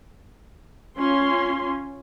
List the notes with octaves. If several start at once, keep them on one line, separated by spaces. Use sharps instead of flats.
C#4 F4 C6